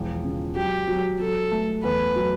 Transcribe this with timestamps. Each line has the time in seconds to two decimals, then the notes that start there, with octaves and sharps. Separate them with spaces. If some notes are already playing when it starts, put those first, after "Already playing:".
Already playing: E1 F3
0.24 C#3
0.56 F#3 G4
0.88 F#3
1.20 F#3 A4
1.52 A3
1.83 E2 B4
2.16 F#3